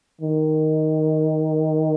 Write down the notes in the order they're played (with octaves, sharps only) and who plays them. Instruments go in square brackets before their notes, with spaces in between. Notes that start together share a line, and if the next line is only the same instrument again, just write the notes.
[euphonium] D#3